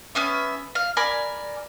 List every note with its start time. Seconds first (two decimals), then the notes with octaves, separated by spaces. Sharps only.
0.15 B3 C#4 E5
0.75 F5
0.97 A#4 D5 G#5 B5